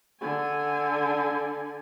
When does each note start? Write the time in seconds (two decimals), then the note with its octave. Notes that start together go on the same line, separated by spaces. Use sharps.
0.21 D3 G#5